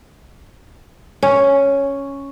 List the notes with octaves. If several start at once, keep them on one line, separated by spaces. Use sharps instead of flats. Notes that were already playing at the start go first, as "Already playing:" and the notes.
C#4